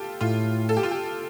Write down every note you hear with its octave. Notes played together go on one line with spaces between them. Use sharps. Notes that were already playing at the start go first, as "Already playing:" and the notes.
Already playing: F4 G4 A4
A2 F4
A4
G4
F4
G4